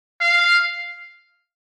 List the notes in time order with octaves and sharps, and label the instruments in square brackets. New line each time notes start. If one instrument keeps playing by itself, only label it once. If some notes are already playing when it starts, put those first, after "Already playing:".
[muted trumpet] F5